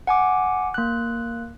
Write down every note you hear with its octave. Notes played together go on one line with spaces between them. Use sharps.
F#5 G#5 D6
A#3 F#6